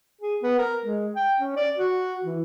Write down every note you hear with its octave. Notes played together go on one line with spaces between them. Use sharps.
G#4
B3
A#4
G#3
G5
C#4
D5
F#4
E3